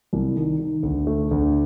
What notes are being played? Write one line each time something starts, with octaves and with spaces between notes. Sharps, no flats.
C2
D#3
D#3
D2
A3
D2